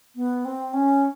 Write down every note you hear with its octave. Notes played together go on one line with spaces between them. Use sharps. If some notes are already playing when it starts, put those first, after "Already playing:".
B3
C4
C#4